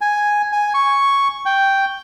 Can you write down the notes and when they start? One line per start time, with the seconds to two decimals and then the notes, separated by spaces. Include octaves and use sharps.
0.01 G#5
0.52 G#5
0.74 C#6
1.46 G5